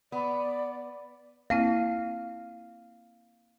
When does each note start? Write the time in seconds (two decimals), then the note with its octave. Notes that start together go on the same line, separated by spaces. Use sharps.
0.12 B3 D5
1.50 A#3 C4 E4 F5